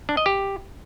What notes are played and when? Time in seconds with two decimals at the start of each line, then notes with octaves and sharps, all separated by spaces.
0.09 D4
0.17 D#5
0.26 G4